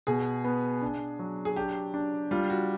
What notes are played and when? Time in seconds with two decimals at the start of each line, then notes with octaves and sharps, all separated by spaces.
0.07 B2 G#4
0.44 B3
0.82 D4
1.19 F#3
1.45 G#4
1.56 D4 G4
1.94 D4
2.31 G3 F4
2.50 F#4